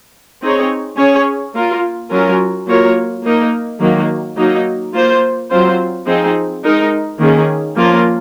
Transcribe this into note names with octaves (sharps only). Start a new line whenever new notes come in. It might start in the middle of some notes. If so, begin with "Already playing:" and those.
C4 D#4 G#4 C#5
C#4 G#4 C#5
A#3 F4 A#4
F#3 C#4 F4 A#4
F#3 A#3 F4 A#4 C#5
A#3 D#4 A#4
D#3 F#3 A#3
F#3 A#3 D#4
A#3 F4 C5
F#3 C4 F4 C5
F3 C4 D#4 G#4
G#3 D#4 A#4
D#3 A#3 C#4 G#4
F3 A#3 C#4 F4 A#4